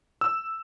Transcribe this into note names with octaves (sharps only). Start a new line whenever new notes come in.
E6